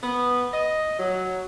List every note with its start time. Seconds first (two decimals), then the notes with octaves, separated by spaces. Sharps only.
0.04 B3
0.54 D#5
0.99 F#3